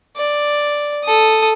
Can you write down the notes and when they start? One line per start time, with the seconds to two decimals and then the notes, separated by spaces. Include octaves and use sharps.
0.17 D5
1.04 A4 D#6